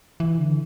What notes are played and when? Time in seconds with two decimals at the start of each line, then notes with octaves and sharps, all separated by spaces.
0.20 E3
0.38 D3